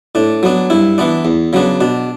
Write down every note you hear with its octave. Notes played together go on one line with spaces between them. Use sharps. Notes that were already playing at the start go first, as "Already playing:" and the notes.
A2 D4
F#3 B3 D4
G2 E4
E3 B3 D4
E2
C#3 F#3 B3 D4
B2 D4